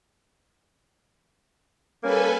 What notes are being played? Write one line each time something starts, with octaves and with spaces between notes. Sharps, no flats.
G3 A#3 C#4 A4 B4 G#5